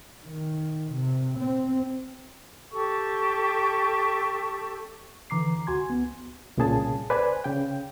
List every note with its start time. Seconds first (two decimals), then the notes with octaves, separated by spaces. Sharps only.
0.24 D#3
0.94 C3
1.39 C4
2.72 G4 A4 C#6
5.30 D3 E3 A#5 D6 C7
5.67 C#2 F#4 G#5 C6 G#6
5.90 B3
6.57 C2 A#2 C#3 G#4 A5
7.10 B4 C5 D5 G#5
7.44 C#3 G5